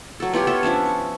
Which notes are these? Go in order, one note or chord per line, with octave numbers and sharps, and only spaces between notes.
F#3 A4
B3 F4 G4 C#5
F4 A4 C#5 E5
F3 C#4 D4 E5
C#6